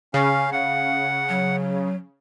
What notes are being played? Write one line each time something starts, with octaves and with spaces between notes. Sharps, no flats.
C#3 C#4 F5
F5 F#5
F#3